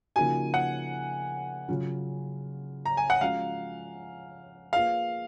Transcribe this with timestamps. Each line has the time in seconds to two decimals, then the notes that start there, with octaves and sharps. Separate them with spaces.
0.16 C#3 F3 A#3 D#4 F#4 G#5
0.54 F#5
1.68 C#3 F#3 C#4 F4
2.85 A#5
2.97 G#5
3.10 F#5
3.21 F3 G#3 C#4 F#4 F5
4.73 A#3 F4 G#4 B4 F5